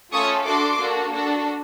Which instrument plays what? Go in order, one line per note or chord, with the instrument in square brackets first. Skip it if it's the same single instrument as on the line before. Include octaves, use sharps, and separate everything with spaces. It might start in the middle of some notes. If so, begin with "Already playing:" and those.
[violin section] A3 C#4 F4 A4 C#6 D#6
D4 F#4 A4 C6 D6
A#3 D4 F#4 A4
D4 F#4 A4